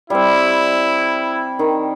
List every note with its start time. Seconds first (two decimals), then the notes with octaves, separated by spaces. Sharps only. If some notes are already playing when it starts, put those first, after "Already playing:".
0.10 G3 C4 E4
1.59 D#3